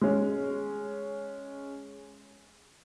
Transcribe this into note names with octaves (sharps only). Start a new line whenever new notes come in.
G#3 C#4